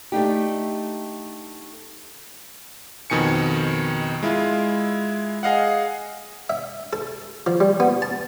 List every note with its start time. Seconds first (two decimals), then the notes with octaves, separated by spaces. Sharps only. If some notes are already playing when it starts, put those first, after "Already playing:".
0.12 A3 D4 D#4 G4
3.10 F2 B2 D#3 G#5 C#7
4.23 G#3 E4 F4
5.43 G#4 D#5 F5 F#5
6.50 E5
6.93 A4
7.47 F3
7.60 G3
7.80 B3
8.02 A5